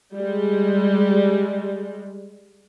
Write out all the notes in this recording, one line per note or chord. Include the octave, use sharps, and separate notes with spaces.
G3 G#3